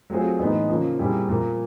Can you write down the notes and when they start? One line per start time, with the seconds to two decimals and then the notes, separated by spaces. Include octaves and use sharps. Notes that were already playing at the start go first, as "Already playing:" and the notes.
0.10 F#3 A3 C4 F4 G#4
0.39 A2 E3 G#3 B3 D#4
0.69 C#3 F3 A#3
0.99 A#2 G3 C4 E4 G#4
1.29 A#2 F3 A#3